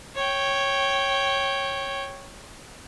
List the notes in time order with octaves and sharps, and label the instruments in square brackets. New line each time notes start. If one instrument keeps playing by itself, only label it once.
[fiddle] C#5 G5